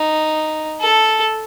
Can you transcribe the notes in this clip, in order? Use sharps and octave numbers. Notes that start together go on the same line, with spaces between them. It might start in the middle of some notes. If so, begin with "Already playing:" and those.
Already playing: D#4
A4